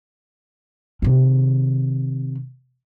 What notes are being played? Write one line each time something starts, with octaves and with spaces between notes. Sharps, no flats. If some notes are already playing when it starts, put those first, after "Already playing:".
C3 D#3